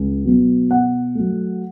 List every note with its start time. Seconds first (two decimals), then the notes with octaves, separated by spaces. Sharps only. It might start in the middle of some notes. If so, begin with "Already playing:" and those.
Already playing: C#2
0.25 B2 F#3 B3
0.70 B2 F#5
1.15 F#3 A3